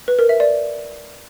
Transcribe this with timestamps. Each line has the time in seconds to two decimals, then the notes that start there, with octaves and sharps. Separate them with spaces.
0.08 B4
0.19 A#4
0.29 E5
0.40 D5